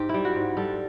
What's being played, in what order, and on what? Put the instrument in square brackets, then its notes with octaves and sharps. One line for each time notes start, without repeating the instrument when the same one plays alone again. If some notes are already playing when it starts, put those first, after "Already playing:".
Already playing: [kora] G#2 G4
G3 E4
F#4
G#2
G3 A4